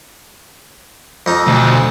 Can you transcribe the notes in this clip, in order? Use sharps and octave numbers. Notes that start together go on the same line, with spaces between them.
F2 D#4
D2 B2